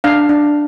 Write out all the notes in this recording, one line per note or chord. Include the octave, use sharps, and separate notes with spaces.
D4 F5
D4